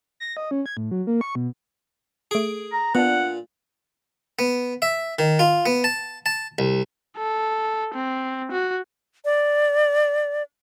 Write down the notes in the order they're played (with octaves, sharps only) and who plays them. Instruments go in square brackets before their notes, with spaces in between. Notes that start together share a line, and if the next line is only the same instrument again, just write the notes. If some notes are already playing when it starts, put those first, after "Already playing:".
[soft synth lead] A#6
D#5
C#4
G#6
A2
F#3
A#3
C#6
B2
[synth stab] A3 D7 [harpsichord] G#4
[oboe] A#5
[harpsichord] A#2 [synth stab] B3 D4 [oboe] F#5
[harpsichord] B3
E5
D#3
F4
B3
A5
A5
C2
[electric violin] A4
C4
F#4
[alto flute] D5